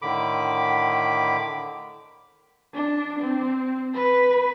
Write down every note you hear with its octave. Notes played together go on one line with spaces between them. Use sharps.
A2 D3 D#3 B5 D6
D4
C4
B4